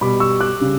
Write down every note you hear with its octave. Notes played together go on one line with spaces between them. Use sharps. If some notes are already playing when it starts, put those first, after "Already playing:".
B2 G3 B5 D6
C#6 E6
D6 F#6
C#3 G3